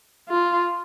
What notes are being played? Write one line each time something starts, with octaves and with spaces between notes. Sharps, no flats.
F4